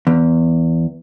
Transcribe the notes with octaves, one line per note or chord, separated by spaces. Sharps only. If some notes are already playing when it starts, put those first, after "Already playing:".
E2